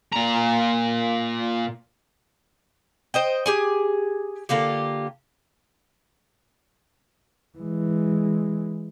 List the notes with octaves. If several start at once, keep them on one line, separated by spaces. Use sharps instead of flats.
A#2 A#5
C5 D#5 G5
G4 G#4 G#5
D3 A#3 F4 G4
E3 G#3